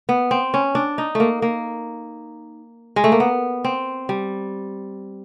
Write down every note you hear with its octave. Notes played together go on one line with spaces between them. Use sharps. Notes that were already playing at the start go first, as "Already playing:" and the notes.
B3
C4
C#4
D4
D#4
A3
A#3
A#3
G#3
A3
A#3
B3
C4
G3